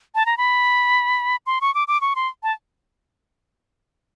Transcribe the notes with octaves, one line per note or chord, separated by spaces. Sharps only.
A5
A#5
B5
C6
C#6
D6
D6
C#6
C6
A5